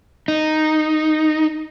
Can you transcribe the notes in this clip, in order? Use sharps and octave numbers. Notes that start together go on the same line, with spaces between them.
D#4